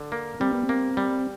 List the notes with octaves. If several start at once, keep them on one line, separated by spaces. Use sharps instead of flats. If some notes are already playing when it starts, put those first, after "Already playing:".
Already playing: D3
A#3
G3 C4
B3
C4
A#3
G3